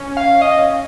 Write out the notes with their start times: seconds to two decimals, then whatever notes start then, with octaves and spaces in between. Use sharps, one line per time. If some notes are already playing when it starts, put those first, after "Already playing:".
Already playing: C#4
0.17 F5
0.41 D#5